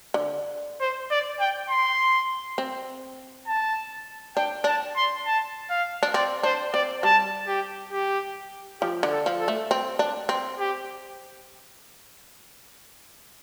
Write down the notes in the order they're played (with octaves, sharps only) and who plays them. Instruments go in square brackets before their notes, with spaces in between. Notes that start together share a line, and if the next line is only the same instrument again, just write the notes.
[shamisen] D3
[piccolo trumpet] C5
D5
G5
C6
[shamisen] C4
[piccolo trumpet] A5
[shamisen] D4 [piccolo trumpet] G5
[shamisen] D4 [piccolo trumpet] A5
[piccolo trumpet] C6
A5
F5
[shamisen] D4
[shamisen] C4 [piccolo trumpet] D5
[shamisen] D4 [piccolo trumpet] C5
[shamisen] C4 [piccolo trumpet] D5
[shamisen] G3 [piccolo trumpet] A5
[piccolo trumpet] G4
G4
[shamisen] F3 [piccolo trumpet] G4
[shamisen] D3
[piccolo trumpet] A4
[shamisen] F3
[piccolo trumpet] A4
[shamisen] A3
C4
D4
C4
[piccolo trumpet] G4